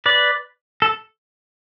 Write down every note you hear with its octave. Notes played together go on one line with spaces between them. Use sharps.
B4 D5
A4